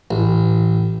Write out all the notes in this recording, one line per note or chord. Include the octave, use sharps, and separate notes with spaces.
A1